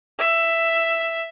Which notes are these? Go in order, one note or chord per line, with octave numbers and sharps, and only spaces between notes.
E5